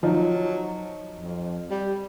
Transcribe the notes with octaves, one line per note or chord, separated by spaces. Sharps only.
F3 F#3 D#4
F2
G3